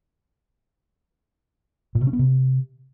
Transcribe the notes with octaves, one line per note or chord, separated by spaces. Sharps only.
A#2
C3
C#4
B3
C3